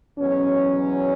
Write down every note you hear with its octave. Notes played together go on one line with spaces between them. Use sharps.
E2 B2 F#3 C#4